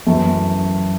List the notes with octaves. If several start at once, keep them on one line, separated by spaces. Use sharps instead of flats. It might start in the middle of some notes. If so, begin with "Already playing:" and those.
F#2 E3 A3 A4